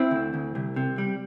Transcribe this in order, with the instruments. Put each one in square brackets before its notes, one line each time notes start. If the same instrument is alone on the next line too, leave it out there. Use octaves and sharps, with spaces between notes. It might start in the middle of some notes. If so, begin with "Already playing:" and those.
Already playing: [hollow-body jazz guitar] C4 E4
D2
D2
C2
C3
G3